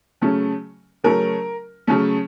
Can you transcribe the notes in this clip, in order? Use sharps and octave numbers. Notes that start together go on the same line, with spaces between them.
C#3 F#3 A3 C#4
C#3 F#3 A3 C#4 A#4
C#3 F#3 A3 C#4